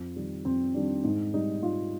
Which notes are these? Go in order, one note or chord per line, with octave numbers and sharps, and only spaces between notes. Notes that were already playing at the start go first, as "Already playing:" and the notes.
Already playing: F2
D#3 G3
F2 C4
D#3 G3 D4
G#2 D#4
G3 D#4
G#2 F4